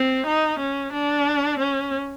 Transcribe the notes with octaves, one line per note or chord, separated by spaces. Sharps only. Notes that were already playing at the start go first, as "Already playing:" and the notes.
Already playing: C4
D#4
C#4
D4
C#4